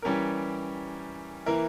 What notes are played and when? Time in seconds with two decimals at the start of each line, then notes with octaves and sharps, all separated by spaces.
0.02 E3 G3 C#4 G4 A#4
1.46 E3 A#3 E4 A#4